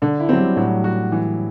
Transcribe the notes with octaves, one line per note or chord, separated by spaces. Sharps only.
D3 D4
E4
F#3 C4
G3
A2 F#3
F#4
E3